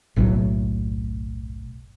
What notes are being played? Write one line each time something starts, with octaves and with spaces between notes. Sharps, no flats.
F#1 B1 A2 F#3